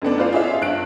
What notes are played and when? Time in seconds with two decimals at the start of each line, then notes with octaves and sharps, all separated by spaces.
0.02 F#2 A3 B3 D4
0.18 F4 B4 C5 D5 F5
0.33 F4 G#4 C#5 E5 F5
0.61 G2 F#6 D7